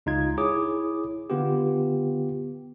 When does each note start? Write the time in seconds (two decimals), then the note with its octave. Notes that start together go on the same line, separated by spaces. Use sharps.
0.06 C#2 D#4 F4 G#6
0.37 E4 G#4 C#5 D6 D#6
1.30 D3 B3 F4 G4